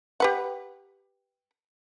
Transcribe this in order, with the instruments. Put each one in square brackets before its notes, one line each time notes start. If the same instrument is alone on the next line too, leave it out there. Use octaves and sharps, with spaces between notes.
[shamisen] G4 B4 F#5